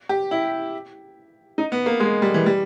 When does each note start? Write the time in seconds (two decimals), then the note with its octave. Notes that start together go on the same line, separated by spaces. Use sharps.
0.09 G4
0.31 E4
1.58 D#4
1.72 B3
1.86 A#3
2.00 G#3
2.22 G3
2.34 E3
2.46 G3